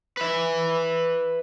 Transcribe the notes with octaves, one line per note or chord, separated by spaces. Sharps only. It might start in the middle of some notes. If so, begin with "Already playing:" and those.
B4 E5